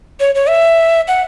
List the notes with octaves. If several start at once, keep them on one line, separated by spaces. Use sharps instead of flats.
C#5
C#5
E5
F#5